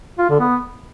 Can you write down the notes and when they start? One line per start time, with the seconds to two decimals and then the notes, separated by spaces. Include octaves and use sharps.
0.19 F4
0.29 D3
0.40 B3